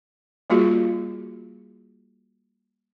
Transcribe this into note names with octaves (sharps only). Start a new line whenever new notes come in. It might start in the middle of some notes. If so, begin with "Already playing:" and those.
G3 A#3 F4 F#4 G#4